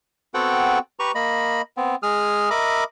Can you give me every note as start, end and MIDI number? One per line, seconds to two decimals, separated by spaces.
0.34 0.79 59
0.34 0.79 60
0.34 0.79 66
0.34 0.79 69
0.34 0.79 78
0.34 0.79 79
0.99 1.12 67
0.99 1.12 71
0.99 1.12 82
0.99 1.12 85
1.15 1.62 58
1.15 1.62 75
1.15 1.62 83
1.77 1.95 59
1.77 1.95 60
2.03 2.50 56
2.03 2.50 68
2.03 2.50 87
2.03 2.50 89
2.50 2.84 70
2.50 2.84 75
2.50 2.84 76
2.50 2.84 83
2.50 2.84 86
2.50 2.84 87